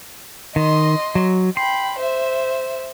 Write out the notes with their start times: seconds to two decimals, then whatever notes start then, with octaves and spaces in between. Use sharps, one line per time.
0.56 D#3 D#5 C6
1.15 F#3
1.57 G5 B5 C6
1.99 C5 E5